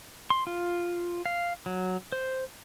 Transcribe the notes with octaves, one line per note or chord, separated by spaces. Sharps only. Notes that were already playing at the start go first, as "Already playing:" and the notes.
C6
F4
F5
F#3
C5